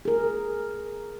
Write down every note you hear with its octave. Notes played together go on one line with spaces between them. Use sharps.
G#4 A#4